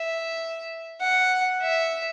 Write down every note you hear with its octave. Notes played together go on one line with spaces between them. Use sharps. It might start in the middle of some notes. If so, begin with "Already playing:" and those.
Already playing: E5
F#5
E5